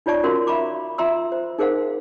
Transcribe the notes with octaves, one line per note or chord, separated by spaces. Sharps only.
D#4 F4 C#5 D5 A5 C#6
C#4 F#4 A#4 F5 C6
E5 F5 A#5 B5 C#6 D6
F4 E5 A#5 C6 E6
C5
D#4 G#4 A#4 C5 F5 F#5